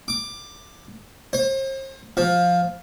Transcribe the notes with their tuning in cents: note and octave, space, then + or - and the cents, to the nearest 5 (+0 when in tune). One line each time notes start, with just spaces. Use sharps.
D6 +10
C5 +40
F3 +10